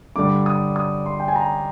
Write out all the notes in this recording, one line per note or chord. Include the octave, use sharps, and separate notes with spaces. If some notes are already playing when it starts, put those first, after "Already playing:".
G2 D3 G3 D6
D#6
D#6
C6
G5
G#5
A#5